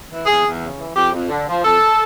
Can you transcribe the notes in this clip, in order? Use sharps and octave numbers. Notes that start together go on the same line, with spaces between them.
E3
E2 G#4
E2
C#3
E3
F2 G4
F2
D3
F3
F2 A4